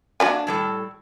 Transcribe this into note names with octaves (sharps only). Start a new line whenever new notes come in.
A#3 D4 F#4 D5 E5 G#5
A2 G3 A4